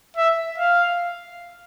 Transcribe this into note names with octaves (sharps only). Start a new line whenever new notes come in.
E5
F5